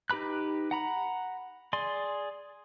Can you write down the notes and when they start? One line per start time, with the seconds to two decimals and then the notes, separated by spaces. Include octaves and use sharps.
0.10 D#4 G4 B4 B5 F#6
0.71 F#5 A#5 B5
1.73 G#4 D5 C6